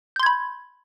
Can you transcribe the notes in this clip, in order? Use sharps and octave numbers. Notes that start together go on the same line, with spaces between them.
B5 C6 G6 G#6